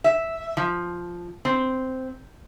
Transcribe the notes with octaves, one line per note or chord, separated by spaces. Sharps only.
E5
F3
C4